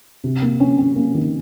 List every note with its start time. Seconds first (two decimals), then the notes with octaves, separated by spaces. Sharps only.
0.24 C3
0.42 A#3
0.60 C#4
0.78 C#4
0.96 A#3
1.14 D#3